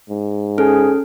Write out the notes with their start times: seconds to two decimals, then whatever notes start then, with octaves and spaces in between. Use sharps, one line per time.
0.10 G#2
0.58 C#4 G#4 A4 F6